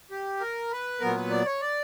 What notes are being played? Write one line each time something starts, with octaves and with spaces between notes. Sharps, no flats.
G4
A#4
B4
A#2 F#3 B3 A#4
B4
D5
C#5
D5